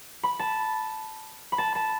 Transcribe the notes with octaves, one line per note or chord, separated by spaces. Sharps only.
B5
A5
B5
A5
A5